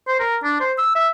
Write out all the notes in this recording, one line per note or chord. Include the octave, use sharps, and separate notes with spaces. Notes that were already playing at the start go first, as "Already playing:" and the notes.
C5
A#4
D4
C5
E6
E5